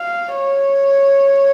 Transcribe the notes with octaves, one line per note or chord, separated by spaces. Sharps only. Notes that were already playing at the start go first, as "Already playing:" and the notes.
Already playing: F5
C#5